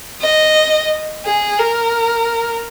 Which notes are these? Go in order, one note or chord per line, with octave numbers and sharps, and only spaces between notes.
D#5
G#4
A#4